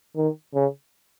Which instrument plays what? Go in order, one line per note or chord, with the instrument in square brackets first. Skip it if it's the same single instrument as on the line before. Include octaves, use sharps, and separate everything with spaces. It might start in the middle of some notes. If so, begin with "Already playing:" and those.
[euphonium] D#3
C#3